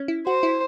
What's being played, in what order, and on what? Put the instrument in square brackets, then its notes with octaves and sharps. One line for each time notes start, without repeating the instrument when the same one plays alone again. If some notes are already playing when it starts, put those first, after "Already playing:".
Already playing: [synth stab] C#4
E4
[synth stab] F#4 [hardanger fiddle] C5
[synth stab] E4